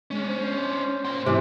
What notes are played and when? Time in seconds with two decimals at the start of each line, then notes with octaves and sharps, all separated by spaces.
0.11 G#3 C#4 D4
0.28 C5
1.05 A#2 C6
1.26 G#2 C3 E3 A3